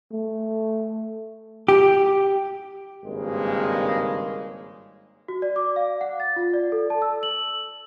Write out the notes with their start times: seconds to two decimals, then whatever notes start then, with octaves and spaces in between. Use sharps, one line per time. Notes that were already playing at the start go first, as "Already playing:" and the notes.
0.12 A3
1.68 G4
3.05 G#1 G2 C#3 G#3 A#3
5.28 F#4
5.42 D5
5.56 D6
5.76 F5
6.01 F#5
6.20 A6
6.36 F4
6.54 D5
6.72 A4
6.90 A5
7.02 E6
7.23 F#7